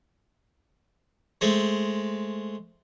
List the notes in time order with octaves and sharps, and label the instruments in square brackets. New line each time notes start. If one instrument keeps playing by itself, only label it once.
[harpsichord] G#3 A3 C4